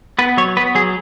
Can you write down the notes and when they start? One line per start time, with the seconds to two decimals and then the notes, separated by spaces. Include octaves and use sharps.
0.19 B3 B4
0.37 F#3 C#5
0.57 B3 B4
0.75 F#3 G#4